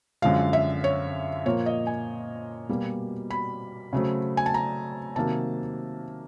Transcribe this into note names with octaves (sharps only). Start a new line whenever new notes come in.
F#2 D3 F3 G#3 F5
E5
C#5
A#2 F3 A#3 C#5
D#5
G#5
B2 G3 A#3
B5
C#3 F#3 A3 C4
G#5
A5
A#5
C3 D#3 F#3 A#3 A5